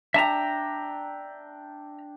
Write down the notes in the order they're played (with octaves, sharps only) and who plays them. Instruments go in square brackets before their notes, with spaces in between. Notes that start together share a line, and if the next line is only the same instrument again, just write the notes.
[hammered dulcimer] D4 G5 [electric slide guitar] E5 A5 A#5